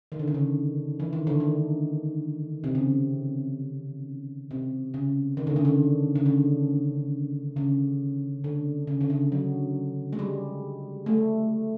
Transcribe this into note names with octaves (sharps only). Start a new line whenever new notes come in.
D#3
D3
C#3
D3
E3
D#3
D3
D#3
C3
C#3
C3
C#3
D#3
D3
C#3
D3
C#3
D3
C#3
D3
C#3
D3
C#3
F#3
G#3
G3
A3